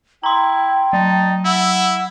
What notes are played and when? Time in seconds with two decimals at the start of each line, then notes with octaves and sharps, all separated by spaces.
0.23 E4 G5 A#5 C6
0.93 F#3 D#4 A5
1.45 E4 F#5 E6